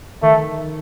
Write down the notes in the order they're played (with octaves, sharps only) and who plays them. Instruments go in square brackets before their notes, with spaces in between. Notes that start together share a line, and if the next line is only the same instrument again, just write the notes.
[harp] D#3 [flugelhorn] A3